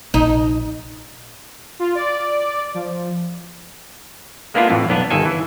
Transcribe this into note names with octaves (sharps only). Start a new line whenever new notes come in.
A#1 D#4
F4
D5
F3
G#3 A#3 B3 D4 E4 F4
F2 A2 E3
B1 B3 D4
G1 D#3 A4 G#5
E3